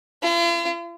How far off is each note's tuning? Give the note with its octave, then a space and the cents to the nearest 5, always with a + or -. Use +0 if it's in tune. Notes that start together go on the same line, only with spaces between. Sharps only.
F4 -45